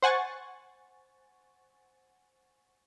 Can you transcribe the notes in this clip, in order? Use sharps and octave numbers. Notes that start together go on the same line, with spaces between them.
C5 F#5 G#5 C#6 A6